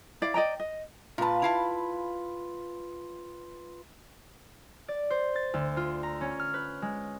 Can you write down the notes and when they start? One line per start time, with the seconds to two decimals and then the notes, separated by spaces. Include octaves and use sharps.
0.22 E4 D5 F5
0.34 D5 D#5 G5 A#5
0.60 D#5
1.18 A#2 F4 B4 A5
1.42 E4 F5 A5
4.88 D5
5.10 C5
5.36 A6
5.54 D2
5.77 F4
6.03 A#5
6.21 C#4
6.40 F6
6.54 B4
6.82 G#3